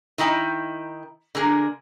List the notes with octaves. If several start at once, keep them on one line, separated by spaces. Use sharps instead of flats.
D#3 D#4 E4 G5
D3 A#3 G#4 A#4